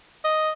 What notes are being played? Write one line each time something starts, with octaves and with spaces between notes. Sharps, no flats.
D#5